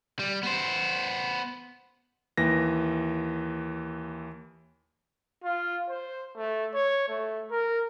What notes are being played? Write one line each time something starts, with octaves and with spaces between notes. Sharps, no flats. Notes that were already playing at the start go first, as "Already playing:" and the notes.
G3
B3 C5
D#2 E3 A#6
F4
C5
A3
C#5
A3
A#4